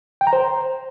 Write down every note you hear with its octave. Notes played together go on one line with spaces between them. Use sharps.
G5
A#5
C5